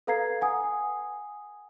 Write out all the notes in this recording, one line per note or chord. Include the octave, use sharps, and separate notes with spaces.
A4 B4 F5 A#5 G#6 C7
F#5 G#5 D#6